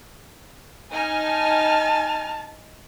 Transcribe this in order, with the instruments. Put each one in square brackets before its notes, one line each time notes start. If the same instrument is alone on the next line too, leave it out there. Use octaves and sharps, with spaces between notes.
[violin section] D#4 G#5 F6
[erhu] A5